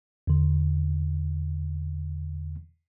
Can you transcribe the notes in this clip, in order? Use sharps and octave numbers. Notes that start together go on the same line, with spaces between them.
E2 D3